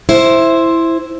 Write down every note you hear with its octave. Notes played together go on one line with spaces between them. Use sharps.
E4 C5